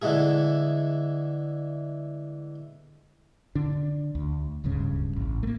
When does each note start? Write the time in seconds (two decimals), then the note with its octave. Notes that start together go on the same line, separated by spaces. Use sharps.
0.02 D3 E3 G#3 A3 G#4
3.55 D3 D4
4.15 D2
4.64 D1 C#2 G2 C#3
5.16 A1
5.43 A3 A#3